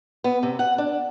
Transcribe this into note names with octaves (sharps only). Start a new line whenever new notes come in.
B3
C3
F#5
D4